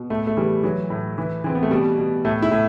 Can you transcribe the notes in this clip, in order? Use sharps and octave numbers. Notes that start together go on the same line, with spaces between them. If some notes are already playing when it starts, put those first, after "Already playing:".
Already playing: B2
A2 A3
A3
E3 G3
E3 F#3
A2
E3
E3 C4
B3
A3
B2 G3
B2
A2 A3
E4
A2